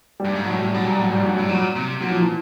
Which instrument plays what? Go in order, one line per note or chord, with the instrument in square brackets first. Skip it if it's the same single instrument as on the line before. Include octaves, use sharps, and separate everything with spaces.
[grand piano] G3
[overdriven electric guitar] G2
G#2
[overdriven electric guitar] A2 [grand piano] F#3
[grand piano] G3
[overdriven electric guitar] B2 [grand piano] F#3
[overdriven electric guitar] A#2 [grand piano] G3
[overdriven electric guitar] A2 [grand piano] F#3
[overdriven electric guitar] G#2 [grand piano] G3
[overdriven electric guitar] G2 [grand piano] F#3
[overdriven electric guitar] A2 [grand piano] G3
[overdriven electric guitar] A#2 [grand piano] F#3
[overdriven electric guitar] C3
[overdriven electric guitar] A#2 [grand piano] F#3
[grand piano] F3
E3